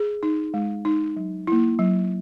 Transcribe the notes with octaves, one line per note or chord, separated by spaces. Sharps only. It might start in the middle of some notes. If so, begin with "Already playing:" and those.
Already playing: G#4
D#4
G#3
D#4
F#3
A#3 E4
F#3